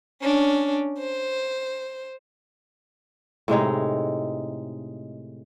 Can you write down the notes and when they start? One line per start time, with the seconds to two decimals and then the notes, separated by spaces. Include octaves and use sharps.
0.22 C#4 D4
0.99 C5
3.48 A2 C3 G#3 D#4